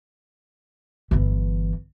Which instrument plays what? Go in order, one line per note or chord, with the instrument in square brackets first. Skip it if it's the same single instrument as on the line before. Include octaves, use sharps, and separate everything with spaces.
[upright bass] G1 E3